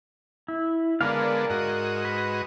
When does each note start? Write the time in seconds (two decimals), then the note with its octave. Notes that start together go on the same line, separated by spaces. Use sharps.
0.48 E4
1.01 D3 G#3 B3 A#4 D5 F5
1.50 G#2 F#4 D#5
2.05 B4